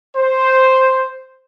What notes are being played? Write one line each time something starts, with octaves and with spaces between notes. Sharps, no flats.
C5